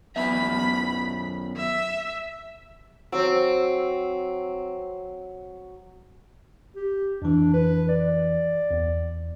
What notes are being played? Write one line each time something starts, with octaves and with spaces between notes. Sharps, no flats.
F#2 B3 E5 B5
E5
F#3 C4
G4
F2 E3 D4
B4
D5
E2